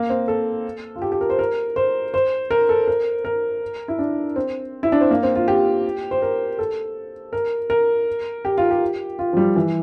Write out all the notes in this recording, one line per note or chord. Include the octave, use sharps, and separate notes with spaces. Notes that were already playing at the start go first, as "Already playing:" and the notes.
Already playing: A#3
C4
A4
F4
G4
G4
A#4
C5
A#4
C5
C5
A#4
A4
A#4
A#4
E4
D4
C4
E4
D4
C4
A#3
C4
F4
G4
C5
A#4
A4
A#4
A#4
G4
F4
G4
F4
F3
G3
E3